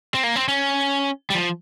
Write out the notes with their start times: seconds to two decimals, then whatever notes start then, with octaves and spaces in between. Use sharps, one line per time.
0.15 C4
0.24 A#3
0.36 C4
0.48 C#4
1.30 G3
1.35 F3